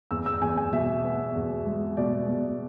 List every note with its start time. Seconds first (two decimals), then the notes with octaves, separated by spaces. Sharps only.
0.11 E2 E6
0.26 E6
0.42 E2 G#5
0.57 G#5
0.73 B2 E5
1.05 B3
1.36 E2
1.66 G#3
1.97 B2 D5
2.28 B2